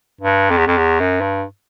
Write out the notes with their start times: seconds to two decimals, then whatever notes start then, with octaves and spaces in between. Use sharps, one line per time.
0.21 G2
0.50 F2
0.58 E2
0.67 F2
0.77 E2
1.00 F#2
1.21 G2